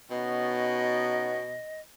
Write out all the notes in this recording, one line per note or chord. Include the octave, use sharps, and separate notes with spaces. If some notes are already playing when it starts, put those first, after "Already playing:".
B2 B3 C#4 D#4 D#5